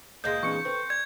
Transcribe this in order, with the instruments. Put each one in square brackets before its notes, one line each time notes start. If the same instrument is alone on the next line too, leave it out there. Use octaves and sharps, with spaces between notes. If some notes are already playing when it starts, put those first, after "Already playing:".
[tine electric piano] C#2 D#5 A#6 [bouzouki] A#2 G#3 A#3 [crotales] G6
[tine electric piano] E3 C4 D4 [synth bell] C#6 C#7
[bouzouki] C4 [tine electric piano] A4 B4
[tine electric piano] D5 [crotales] G#6